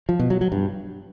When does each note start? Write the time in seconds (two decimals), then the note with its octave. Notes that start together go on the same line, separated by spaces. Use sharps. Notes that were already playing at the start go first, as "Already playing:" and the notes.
0.09 F3
0.19 B2
0.30 F#3
0.41 F#3
0.52 G2